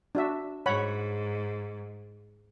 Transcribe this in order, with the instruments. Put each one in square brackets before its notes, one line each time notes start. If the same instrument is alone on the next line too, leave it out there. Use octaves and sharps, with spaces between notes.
[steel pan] D4 F#4 E5
[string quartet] G#2 [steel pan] C#5 F#5 B5